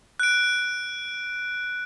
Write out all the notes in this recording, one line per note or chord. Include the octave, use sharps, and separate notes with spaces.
F#6 D7